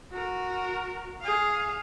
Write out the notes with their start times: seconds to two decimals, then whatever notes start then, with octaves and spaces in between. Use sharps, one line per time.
0.12 F#4 A#4
1.21 G#4 F5